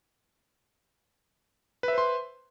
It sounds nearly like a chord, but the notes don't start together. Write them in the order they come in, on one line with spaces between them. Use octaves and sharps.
B4 E5 C5 C6